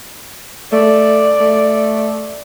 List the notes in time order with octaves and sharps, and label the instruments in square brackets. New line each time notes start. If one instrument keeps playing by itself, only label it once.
[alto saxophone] A3 [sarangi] D5
[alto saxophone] A3